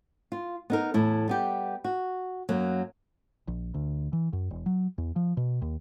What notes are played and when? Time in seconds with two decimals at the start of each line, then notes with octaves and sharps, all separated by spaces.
0.32 F4
0.70 B3 D#4 A#4
0.94 E2 A2 E4
1.28 G3 B3 G4
1.84 F#4
2.49 F#2 F#3 A#3
3.48 A#1
3.74 D2
4.13 E3
4.33 F#2
4.51 E1
4.66 F#3
4.98 E2
5.16 F3
5.37 B2
5.62 D#2